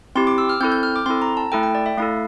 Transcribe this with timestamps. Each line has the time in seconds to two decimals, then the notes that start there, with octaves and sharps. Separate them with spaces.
0.15 C4 E4 G4 C6
0.27 D6
0.38 E6
0.49 F6
0.60 C4 E4 A4 G6
0.72 G6
0.83 F6
0.96 D6
1.06 C4 E4 A4 C6
1.22 A#5
1.37 A5
1.52 A3 E4 A4 G5
1.63 G5
1.75 D5
1.86 E5
1.98 A3 E4 A4 F5